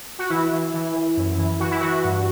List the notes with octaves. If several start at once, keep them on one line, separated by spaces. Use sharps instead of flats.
F#4
E3 E4
E3
E3
E3
F#2
E3
E3 F#4
E4
E3 F#4
G2